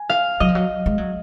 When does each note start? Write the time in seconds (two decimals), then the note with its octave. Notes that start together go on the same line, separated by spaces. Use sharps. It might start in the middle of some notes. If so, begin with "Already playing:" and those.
Already playing: G#5
0.10 F5
0.40 F#3 D#5
0.49 F3
0.55 F#3
0.86 G#3
0.98 F#3